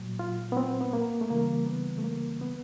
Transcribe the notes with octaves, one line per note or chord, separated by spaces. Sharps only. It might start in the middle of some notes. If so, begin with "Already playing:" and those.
Already playing: A#2 F#3
F4
B3
C4
B3
A#3
A3
C#3 E3 G3 A#3
B3
A3
A#3
B3